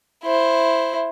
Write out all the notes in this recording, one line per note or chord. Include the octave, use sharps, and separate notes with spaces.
E4 C5